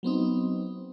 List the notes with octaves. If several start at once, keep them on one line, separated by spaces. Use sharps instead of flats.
F#3 B3 C4 D#4